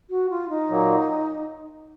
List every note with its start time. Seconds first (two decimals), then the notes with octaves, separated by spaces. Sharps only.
0.10 F#4
0.30 F4
0.49 D#4
0.69 A#2 F#3 A#3